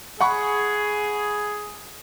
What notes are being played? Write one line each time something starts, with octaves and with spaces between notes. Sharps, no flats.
G#4 F#5 B5 C#6